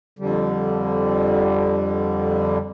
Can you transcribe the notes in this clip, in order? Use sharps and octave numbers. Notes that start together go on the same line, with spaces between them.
F2 D3 G3